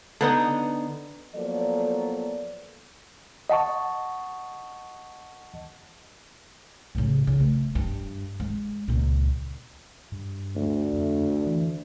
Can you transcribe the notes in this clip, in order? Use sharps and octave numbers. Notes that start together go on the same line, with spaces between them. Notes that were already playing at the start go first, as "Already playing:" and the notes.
D3 B3 D#4
F3 F#3 A#3 B3 A4 D5
D#5 F#5 A5 C#6
A2 C#3
C#3
A3
G2
G#3
C#2 A#2
G2
D2
F2
E3